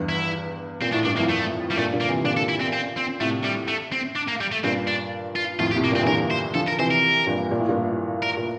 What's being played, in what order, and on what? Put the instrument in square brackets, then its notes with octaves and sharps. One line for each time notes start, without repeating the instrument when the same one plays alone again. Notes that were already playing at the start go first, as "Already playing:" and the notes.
Already playing: [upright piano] E2 G2
[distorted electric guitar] E4
[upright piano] A#2 [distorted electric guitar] C4
[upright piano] A2 [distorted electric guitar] D4
[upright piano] G2 [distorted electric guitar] D4
[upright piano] F2 A2 [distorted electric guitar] A#3
[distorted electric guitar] A3
G3
[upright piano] G2 A#2 [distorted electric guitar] A3
[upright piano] A#2 D3
[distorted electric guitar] A#3
[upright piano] C3 E3
[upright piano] A#2 D3 [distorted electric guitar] D4
[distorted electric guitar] A4
E4
C4
C4
C4
[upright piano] A2 C3 [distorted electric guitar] A3
[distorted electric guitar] G3
A3
C4
D4
A#3
G3
A3
[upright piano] G2 A#2 [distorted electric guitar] C4
[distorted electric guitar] D4
F4
[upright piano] F2 A2 [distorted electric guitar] F4
[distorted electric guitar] G4
[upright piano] A2 C3
[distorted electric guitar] A#3
[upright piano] G2 A#2 [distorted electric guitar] C4
[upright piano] E3
[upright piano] A#2 D3 [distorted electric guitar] A#4
[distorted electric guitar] C5
[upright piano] D3 F3 [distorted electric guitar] A4
[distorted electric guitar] A#4
[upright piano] C3 E3 [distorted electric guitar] C5
[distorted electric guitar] A#4
[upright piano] G2 A#2
A#2
A2
G2 A#2
[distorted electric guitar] A#4
[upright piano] A#2